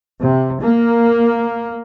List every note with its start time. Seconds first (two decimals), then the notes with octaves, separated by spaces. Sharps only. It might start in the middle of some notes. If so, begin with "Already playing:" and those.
0.21 C3
0.61 A#3